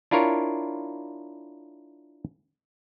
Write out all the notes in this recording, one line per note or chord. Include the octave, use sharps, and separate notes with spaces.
D4 E4 F4 A#4 C#5